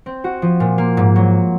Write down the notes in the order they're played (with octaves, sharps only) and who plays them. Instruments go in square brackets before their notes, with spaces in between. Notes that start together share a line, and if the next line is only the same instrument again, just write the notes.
[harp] C4
F#4
F3
A#2
A#3
G#2
F#3